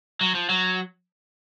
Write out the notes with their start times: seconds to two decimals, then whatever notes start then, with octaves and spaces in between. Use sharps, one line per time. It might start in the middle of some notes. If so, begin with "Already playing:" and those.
0.21 F#3
0.35 F3
0.49 F#3